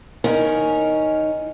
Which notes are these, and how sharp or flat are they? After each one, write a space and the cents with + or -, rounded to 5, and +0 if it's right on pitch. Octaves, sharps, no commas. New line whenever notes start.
D#3 +0 C#4 +0 A#4 +0